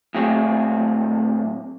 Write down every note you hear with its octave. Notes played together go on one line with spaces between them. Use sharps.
A2 F#3 C4 G#4 C#5